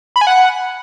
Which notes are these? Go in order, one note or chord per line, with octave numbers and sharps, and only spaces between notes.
B5
G#5
F#5